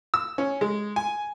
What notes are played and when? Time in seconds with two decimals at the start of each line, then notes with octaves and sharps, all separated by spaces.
0.14 E6
0.38 C#4
0.61 G#3
0.96 G#5